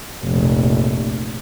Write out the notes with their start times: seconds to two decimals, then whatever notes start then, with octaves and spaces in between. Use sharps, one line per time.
0.25 F1 A#1